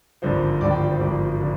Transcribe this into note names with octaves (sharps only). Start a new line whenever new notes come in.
G#1 G2 D3 F3 C5
G#1 G2 D3 F3 D5
G5
D5
C5
G#1 G2 D3 F3 D5
D3 F3